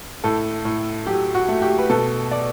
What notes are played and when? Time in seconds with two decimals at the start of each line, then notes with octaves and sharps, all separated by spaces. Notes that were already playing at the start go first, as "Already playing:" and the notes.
0.24 A2 A4
0.65 A2
1.06 F#3 G4
1.35 F#4
1.48 A3
1.62 G4
1.78 B4
1.90 B2 A4
2.31 D5